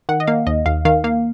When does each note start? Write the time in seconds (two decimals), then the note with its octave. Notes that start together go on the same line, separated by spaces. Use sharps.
0.09 D#3 F#5
0.20 D#5
0.27 A#3 F5
0.47 D#2 D#5
0.66 D#2 F5
0.85 D#3 F5
1.04 A#3 F5